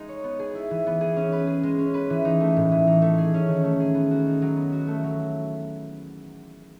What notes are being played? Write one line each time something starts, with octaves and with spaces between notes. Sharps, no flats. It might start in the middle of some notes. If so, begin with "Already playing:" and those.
Already playing: G#3 D#4 G#4
C#5
B3
G#4
E4
E3
B3
G#4
C#4
B4
G#4
G#3
C#4
B4
E3
D#4
A3
A2
E3
D#4
A3
G#4
C#4
D#3
A3
G#4
B3
F#4
D#4
F#3
B3
F#4
A3
F#3